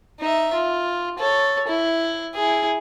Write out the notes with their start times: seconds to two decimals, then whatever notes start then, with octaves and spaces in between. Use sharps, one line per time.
0.20 D#4 E5
0.54 F4
1.19 A4 C#5
1.68 E4
2.35 E4 G#4